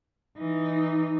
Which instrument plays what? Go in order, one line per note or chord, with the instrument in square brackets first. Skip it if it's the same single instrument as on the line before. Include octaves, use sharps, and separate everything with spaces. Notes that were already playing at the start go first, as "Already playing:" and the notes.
[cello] E3 D#4